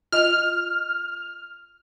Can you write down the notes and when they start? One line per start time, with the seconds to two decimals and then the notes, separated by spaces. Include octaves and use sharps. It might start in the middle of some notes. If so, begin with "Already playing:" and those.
0.12 F4 D#5 F6